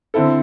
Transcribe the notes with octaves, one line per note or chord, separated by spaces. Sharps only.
D3 C4 E4 A4